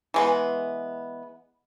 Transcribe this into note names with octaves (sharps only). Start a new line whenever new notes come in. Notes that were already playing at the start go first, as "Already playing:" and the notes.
E3 G#3 B3